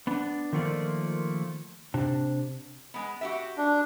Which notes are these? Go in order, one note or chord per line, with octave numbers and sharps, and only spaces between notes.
B3 D4
D#3 F3 A3 A#3 F4 D5
C3 D4
G#3 B3
F#4 G4 E5
D4